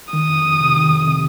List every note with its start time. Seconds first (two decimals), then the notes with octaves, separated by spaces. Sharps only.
0.13 D#3 D#6
0.28 F2
0.44 F2
0.60 C3
0.76 D#3
0.91 F2
1.07 C3